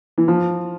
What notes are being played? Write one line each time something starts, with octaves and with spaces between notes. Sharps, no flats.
E3
F3